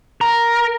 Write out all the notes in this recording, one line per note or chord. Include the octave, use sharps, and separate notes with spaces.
A#4